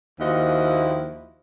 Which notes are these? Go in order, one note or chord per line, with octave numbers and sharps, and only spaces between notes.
D#2 F3 E4 F#4 D#5